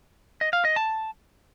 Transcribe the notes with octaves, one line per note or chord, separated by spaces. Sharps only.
D#5
F5
D#5
A5